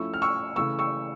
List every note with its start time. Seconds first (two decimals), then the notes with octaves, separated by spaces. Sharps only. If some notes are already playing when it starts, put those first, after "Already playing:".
Already playing: F3 A3 C#4 E4 C#6 E6
0.14 F6
0.22 C#6 E6
0.56 C#3 E3 A3 C#6 E6
0.79 C#6 E6